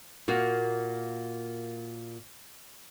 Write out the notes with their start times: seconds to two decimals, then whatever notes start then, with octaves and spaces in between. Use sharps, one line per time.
0.28 A#2 A#3 F#4